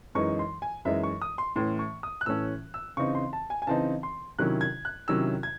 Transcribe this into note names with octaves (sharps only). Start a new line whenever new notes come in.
F#2 E3 G#3 D#4 C#6
C6
G#5
F#2 E3 G#3 D#4 E5
C#6
D#6
C6
A2 E3 A3 C#4 C6
C#6
D#6
F#6
A2 E3 A3 C#4 E6
E6
C#3 E3 C4 D#4 C#6
C6
A5
G#5
G#5
C#3 E3 C4 D#4 A5
C6
C3 D#3 F#3 C#4 E4 F#6
G#6
F#6
C3 D#3 F#3 C#4 E4 E6
G#6